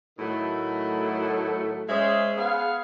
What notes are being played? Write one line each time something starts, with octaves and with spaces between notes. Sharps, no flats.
A2 D#3 F#3 A3
G#3 C#4 G#4 C5 E5
B3 G#4 F5